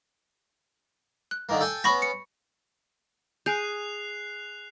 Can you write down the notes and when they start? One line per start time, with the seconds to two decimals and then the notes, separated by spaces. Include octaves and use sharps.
1.31 F#6
1.49 D3 D#3 A#3
1.61 A4 G5 G#5
1.84 B3 C#4 B5 C#6 A#6
2.02 C#7
3.46 G#4 G#5 F#6 G6 C7 F7